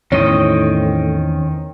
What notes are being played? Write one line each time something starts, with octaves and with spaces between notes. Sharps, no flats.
E2 A2 D#3 C4 C#4 C#5 D#5